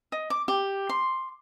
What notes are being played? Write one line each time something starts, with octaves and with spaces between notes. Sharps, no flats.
D#5
D6
G4
C6